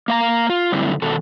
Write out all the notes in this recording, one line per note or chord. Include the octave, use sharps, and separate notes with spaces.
A#3 F5 A#5
F4
F#2 D3 G3 A3 C4 E4
B2 D#3 A4